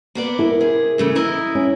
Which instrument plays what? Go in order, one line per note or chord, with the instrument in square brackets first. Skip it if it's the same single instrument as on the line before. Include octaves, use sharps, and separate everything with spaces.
[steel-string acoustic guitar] A#3 B3 D5
[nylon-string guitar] E4 A#4
[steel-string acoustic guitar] C3 G#4
E2 C#3 A3
E4 A#4 D#5
[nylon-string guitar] C#4